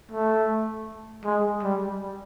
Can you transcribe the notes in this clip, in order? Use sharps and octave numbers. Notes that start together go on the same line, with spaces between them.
A3
G#3
G3